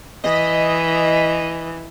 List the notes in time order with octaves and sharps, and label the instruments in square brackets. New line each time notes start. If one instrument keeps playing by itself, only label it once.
[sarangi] E3 [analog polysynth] D#5